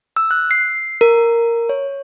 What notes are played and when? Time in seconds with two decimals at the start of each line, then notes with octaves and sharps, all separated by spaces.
0.17 E6
0.31 F#6
0.51 C7
1.01 A#4
1.69 C#5